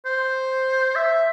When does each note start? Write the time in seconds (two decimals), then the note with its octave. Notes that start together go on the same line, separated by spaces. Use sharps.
0.06 C5
0.96 E5